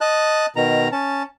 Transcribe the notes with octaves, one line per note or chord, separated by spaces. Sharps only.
D#5 A5 F#6
B2 D#3 A#5
C#4 A5